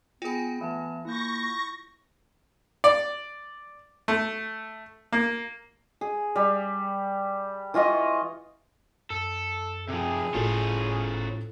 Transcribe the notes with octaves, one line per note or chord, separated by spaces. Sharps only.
B3 F4 G#4 G5 G#5
E3 A3 B3 A5
A#3 E4 C#6 G6 A#6
D5
A3
A#3
G#4
G3
E3 F4 D#5 C#6
F#2 A4
C3 F3 G#4
F#1 A2 C#4 F4 A4 C5